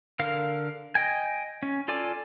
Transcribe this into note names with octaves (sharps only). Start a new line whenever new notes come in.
D3 A#4 F5
D#5 G5 G#5
C#4
F4 A4 D5 G#5 D6